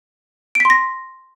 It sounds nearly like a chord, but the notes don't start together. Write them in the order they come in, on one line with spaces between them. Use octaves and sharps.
D7 B6 C6 A#6